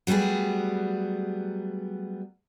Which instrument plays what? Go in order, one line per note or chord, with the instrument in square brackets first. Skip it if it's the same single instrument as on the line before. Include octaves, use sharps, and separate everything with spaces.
[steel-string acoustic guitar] F#3 G3 A3 B3 G#4